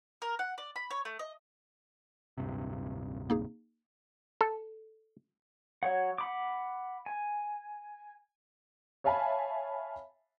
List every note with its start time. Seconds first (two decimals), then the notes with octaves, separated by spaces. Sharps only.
0.22 A#4
0.39 F#5
0.58 D5
0.76 B5
0.91 C#5
1.05 A3
1.19 D#5
2.38 D1 G2 C3
3.30 A#3 D#4 G#4
4.41 A4
5.83 F#3 C#5 F#5
6.18 F#5 B5 D6
7.06 G#5
9.04 C#5 E5 F5 G#5 A5 B5